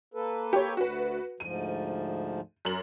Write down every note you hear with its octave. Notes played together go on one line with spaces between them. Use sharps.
A#3 A4 B4
G4 C#5
D2 F#4 B4
D2 G#2 F3 D#7
F#2 F#7